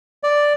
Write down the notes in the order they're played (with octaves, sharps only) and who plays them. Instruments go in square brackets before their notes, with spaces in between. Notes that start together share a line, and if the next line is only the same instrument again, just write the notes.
[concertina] D5